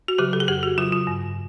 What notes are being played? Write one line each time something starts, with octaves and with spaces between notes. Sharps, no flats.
F#4
C#3 F#3 G4
A4
G#4
F2 G4
F#4
C#3 F#3 F4
F4
G2